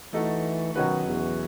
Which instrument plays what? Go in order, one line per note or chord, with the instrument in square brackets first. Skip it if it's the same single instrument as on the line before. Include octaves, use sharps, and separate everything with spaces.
[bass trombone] E3 [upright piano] A3 D#4 F#4 A4
[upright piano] B2 F#3 C#4 F#4 B4 [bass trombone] D#3
[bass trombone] E2